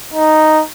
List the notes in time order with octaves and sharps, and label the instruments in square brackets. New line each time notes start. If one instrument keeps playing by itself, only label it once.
[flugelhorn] D#4